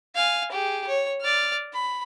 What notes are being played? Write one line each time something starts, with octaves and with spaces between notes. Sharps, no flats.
F5 G#5
G4 G#4
C#5
D5 F6
B5